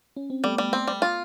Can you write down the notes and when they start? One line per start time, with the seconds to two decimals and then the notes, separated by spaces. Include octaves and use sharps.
0.17 C#4
0.30 C4
0.44 G3 A3 B3
0.58 G3
0.73 C4
0.88 G3
1.02 F4